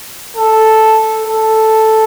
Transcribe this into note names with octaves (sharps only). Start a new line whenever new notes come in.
A4
A4